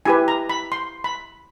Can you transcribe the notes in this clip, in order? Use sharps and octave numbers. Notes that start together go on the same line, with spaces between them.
E4 G4 B4 G#5
A#5
B5
C6
B5